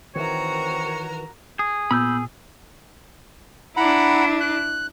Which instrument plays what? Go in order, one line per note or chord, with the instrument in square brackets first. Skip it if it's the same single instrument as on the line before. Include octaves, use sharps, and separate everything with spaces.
[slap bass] D#3 E3 [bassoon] C4 [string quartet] F#4 A#4 A#5 [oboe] C#5
[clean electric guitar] G#4
[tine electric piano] A#2 [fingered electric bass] B3 [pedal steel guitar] B5 E6 G6
[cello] D4 E4 [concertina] F#5 A#5 B5
[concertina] F#6